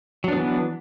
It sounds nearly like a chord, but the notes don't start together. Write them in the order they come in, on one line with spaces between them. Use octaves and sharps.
F#3 D4 B3 E3